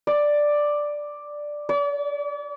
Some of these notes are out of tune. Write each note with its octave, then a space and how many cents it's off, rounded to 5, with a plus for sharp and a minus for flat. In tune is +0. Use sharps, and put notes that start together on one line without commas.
D5 +5
D5 -40